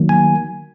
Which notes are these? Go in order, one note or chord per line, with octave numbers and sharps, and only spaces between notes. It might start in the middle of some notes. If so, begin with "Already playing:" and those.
Already playing: D#3 F#3 A#3
G#5